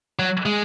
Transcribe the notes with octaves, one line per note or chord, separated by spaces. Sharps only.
F#3
G#3